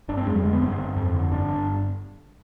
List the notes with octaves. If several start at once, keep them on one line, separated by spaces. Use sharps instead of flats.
G1 D4
C4
F2 G#3
G3
D3 G#3
B3
G1 C4
G1
F2
D3
G1 D4
G1